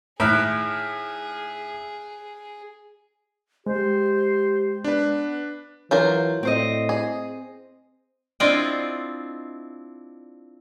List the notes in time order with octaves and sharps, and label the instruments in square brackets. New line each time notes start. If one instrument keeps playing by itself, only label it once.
[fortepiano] A2 D#3 [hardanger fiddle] G#4 [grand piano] E5 F6 F#6
[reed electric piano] G#3 [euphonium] G4 [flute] C5
[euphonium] B3 [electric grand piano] D4 B4
[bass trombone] E3 [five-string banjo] F#3 F4 A#4 [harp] G6
[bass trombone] A2 [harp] C4 C5 D#5
[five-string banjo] G#4
[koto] C4 D4 E4 F4 D5 D#5